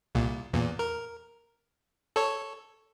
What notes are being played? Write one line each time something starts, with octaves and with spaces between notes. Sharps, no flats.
C2 A#2
E2 A#2
A#4
A4 C#5